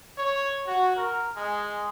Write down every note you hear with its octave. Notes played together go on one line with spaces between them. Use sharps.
C#5
F#4
A#4
G#3